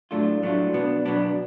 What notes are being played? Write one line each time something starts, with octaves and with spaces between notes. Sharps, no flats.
A2 F#3 A3 D4 F4
A2 F#3 A3 D4 F4
B2 F#3 B3 D4
B2 F#3 B3 D4